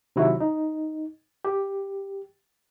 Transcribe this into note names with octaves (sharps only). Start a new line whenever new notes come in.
C3 D#3 F#3 E4 F#4
D#4
G4